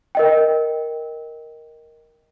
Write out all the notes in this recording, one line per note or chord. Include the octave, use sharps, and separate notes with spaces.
A#4 D#5 G5